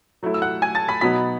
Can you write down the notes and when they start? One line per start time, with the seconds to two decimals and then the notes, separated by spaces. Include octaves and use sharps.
0.23 F#3 A3 E4
0.34 E6
0.42 F#5 F#6
0.62 G#5 G#6
0.75 A5 A6
0.88 B5 B6
1.01 B2 F#3 B3 D#4 B5 B6